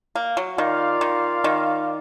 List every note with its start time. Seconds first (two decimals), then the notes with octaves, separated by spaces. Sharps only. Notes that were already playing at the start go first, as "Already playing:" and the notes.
0.15 A#3
0.37 F#3
0.58 D#3 F4 A#4 D5 F5
1.01 D#3
1.44 D#3